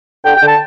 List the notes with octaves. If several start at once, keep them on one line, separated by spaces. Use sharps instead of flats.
D3 G5
G5
D3
A5